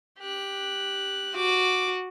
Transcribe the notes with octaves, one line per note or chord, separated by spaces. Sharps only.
G4 F#6
F#4 D6